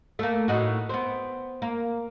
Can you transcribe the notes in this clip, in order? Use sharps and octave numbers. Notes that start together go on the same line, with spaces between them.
A3 A#3
A2 D#4 F#4
B3 C4
A#3